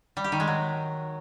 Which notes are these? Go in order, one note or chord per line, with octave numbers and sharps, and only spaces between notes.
G3
G4
D#3
G#3
F#3